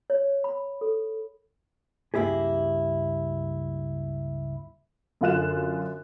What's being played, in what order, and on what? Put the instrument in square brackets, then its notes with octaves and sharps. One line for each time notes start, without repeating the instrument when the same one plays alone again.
[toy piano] C#5
B5
A4
[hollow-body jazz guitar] C#2 G2 A#3 E4 G4 G#4
[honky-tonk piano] F#2 D3 F4 F#6 E7